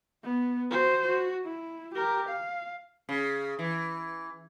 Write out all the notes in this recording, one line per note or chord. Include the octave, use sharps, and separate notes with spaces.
B3
F#4 C5
F#4
E4
G4 A#4
F5
C#3
E3